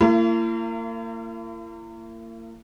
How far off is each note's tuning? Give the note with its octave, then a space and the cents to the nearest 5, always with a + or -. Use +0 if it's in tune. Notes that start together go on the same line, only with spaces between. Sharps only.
A#3 -35 E4 +40